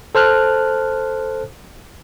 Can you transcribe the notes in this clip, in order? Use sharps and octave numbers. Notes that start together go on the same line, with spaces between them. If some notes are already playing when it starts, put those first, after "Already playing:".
A4 C5 A5 F6 F#6